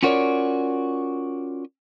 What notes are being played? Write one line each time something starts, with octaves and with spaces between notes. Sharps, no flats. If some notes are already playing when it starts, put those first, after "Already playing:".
C#4 F4 F#4 A#4 C#5 D5